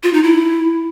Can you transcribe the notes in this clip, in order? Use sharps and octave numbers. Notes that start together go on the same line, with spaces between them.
F4
D#4
E4